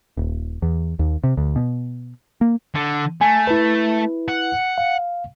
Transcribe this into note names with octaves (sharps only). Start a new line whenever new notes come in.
D#1
E2
D#2
C3
D2
B2
A#3
D3
A3 G#5
E4 B4
F#5
F5